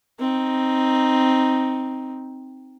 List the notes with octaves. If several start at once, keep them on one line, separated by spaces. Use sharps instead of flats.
C4 D#4